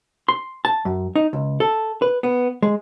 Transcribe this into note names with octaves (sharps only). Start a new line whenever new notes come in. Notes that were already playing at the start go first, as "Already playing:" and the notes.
C6
A5
F#2
D#4
C#2
A4
B4
B3
G#3